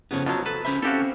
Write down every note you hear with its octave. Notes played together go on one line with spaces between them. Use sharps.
F2 C#3 B3 C#5
B2 F3 F#3 F4 A5
A4 B4
C#4 C5 E5 B5
C4 C#4 F#4 G4 A4 C5 F5